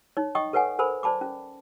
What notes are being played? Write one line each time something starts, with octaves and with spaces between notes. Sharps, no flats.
D#4 C#5
D#5 G5 C#6 D#6
A4 B4 C#5 F#5 G#5
A4 A#4 C5 G#5 B5
C5 D5 A5 B5 D6
C#4